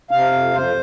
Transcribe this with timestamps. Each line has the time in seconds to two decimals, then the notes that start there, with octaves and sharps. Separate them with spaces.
0.11 C3 F5
0.32 F2
0.54 F2 C5